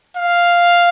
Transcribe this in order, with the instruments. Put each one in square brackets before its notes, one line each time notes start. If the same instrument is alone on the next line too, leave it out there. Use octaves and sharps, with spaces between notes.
[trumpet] F5